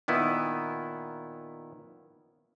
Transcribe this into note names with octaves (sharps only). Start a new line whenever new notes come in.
A#2 D#3 B3 E4